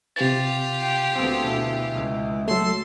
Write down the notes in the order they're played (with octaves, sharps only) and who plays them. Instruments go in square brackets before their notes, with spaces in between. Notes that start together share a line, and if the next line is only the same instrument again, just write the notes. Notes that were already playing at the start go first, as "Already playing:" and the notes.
[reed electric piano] C3 A6 [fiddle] F4 G4
[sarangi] G5
[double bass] D2 B3 [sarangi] C4
[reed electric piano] B2 [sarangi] E3
[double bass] C#2 G#3
[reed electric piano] F#3 A3 [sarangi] A4 [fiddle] C6